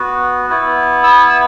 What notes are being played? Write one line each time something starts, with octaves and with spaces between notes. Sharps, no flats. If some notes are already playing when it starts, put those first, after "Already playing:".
Already playing: B3 F#4
B3 E4
E6
E6